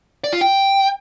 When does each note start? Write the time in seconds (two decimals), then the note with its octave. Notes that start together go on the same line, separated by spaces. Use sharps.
0.24 D5
0.33 F4
0.41 G5